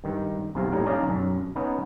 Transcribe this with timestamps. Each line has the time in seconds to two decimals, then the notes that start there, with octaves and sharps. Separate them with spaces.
0.04 G2 D#3
0.55 B1 E2 C3 F5
0.72 A#1 A2 G3 D#4 D#5
0.86 C#4 D#4 D5 D#5 F5
1.06 B1 F#2
1.56 B3 C#4 D#4